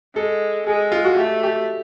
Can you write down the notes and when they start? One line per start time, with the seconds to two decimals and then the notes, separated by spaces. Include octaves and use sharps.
0.15 G#3 A4
0.67 G#3 G#4
0.92 F4
1.05 F#4
1.17 A3 G4
1.43 G4